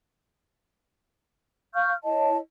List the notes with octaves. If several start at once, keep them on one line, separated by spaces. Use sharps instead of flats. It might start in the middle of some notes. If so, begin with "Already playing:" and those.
F5 C#6 F6 G6
E4 C#5 D#5 A5